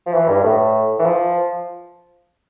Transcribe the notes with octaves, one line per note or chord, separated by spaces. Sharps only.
F3
E3
G2
A2
E3
F3